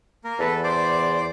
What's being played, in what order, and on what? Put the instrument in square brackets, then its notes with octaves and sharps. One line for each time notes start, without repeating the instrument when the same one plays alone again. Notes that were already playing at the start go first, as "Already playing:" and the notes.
[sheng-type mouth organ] A#3 A#4
[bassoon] E2 [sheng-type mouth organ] A4 B4
[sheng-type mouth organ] C5 D5